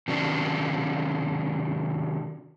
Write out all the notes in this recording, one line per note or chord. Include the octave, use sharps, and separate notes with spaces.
C3 D#3 F#3 C#4 D4